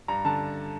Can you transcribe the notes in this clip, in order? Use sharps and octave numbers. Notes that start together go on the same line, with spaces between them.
G2 A#5
D3 A5